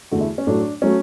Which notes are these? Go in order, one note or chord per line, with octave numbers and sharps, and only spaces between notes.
E2 D3 A3 F#4
E4
C#4
A2 F#3 A3 D4
F#3 A3 C#4